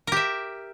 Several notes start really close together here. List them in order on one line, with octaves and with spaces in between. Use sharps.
A#4 G4 E5